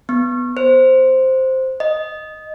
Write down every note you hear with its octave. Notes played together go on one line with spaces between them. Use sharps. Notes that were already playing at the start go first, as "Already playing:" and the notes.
B3
C5
D#5